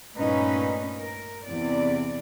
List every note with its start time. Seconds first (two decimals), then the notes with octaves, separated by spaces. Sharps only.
0.18 G2 A#2 A3 C#4 D#4 B4
0.99 A#4
1.46 E2 C3 E3 D5